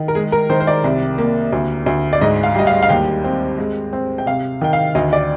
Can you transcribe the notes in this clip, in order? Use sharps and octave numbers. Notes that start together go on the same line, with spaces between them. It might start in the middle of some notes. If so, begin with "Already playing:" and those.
Already playing: D#3
A#4
G#3 G#4
A#4
D#3 C5
C5
D5
C2
A#3
D2
D2
D5
G#2 D#5
F5
G3 D#5
F5
F5
D#2 G5
C4
G#3
C4
G5
C3 F5
D#3 G5
F5
D2 D#5
D5